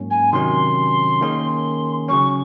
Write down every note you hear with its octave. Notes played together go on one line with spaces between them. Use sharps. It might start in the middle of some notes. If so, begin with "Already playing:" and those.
Already playing: G#2 F#3 A#3 C#4
G#5
C3 D#3 F#3 C#4 C6
D#3 A#3 C#4 G#4
C#3 F#3 C#4 C#6